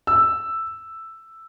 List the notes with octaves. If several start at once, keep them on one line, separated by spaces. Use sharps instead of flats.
E6